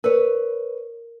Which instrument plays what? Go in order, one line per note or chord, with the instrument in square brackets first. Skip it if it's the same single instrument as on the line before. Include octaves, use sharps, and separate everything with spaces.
[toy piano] A#4 [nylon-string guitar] B4 C#5